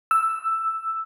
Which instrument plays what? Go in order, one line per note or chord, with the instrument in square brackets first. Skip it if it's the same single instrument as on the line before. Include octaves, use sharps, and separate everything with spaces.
[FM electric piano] E6